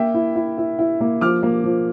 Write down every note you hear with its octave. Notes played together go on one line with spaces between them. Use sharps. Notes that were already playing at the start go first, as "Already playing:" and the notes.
Already playing: A#3 E5 G5
E4
E4
E4
E4
A#3
F3 D6 F6
A#3
F3